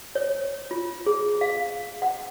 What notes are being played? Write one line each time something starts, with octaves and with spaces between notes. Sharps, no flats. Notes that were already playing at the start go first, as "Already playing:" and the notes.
C#5
F4
G#4
F5
F#5